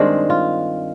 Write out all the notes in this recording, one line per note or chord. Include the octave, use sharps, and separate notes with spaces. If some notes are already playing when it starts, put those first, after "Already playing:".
Already playing: G2 D#3 G#3 C4 D4
F4